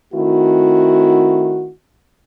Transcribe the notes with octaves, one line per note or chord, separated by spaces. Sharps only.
D#3 A3 C4 E4 F#4